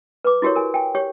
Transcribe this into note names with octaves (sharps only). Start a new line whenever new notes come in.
B4 D6
E4 F#4 G4 A#4 C#5
A#4 G#5
G5 G#5
G4 C#5